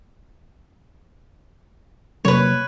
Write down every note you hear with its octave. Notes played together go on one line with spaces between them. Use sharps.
C3 F#3 A#3 B4 C#5